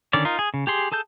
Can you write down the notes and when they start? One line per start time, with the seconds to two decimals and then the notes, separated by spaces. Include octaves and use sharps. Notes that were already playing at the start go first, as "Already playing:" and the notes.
0.13 D3 D#3 C#4 D5
0.25 D#4 F4 A#4
0.39 G#4
0.54 C#3
0.67 G4 G#4 C6
0.92 G#4 A4 A5 G6